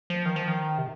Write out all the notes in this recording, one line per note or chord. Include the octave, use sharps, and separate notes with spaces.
F3
D#3
F3
D#3
C3